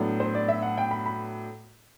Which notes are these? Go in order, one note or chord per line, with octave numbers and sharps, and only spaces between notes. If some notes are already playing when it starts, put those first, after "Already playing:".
Already playing: A2 F#3 B3 D4
C5
D5
E5
F#5
G5
B5
B5